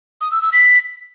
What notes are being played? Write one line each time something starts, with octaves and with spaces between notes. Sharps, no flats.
D#6
E6
E6
B6